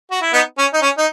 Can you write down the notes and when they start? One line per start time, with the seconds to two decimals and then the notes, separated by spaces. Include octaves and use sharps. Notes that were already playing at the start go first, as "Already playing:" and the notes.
0.11 F#4
0.22 E4
0.33 B3 D#4
0.58 C#4
0.74 D#4
0.82 C#4
0.98 D#4